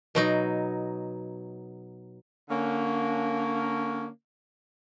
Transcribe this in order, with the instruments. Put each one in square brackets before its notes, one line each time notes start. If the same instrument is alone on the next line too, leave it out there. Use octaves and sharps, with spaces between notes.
[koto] B2 F#3 D#4
[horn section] D3 A#3 C#4